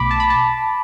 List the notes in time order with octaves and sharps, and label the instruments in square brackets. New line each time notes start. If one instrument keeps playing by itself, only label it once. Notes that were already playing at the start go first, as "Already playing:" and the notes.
Already playing: [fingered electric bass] B1 B2 A3 [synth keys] B5 D6
[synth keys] A5
B5
A5